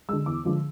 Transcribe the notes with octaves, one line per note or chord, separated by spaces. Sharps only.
D3 G#3 E6
E2 D6
D3 F3 G#3